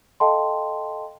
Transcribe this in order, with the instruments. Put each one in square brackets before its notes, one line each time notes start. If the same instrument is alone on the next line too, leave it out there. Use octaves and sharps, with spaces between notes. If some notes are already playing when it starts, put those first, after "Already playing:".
[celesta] A4 D#5 F5 G5 A5 C6